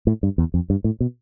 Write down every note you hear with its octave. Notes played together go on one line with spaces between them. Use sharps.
A2
G2
E2
F2
G2
A2
B2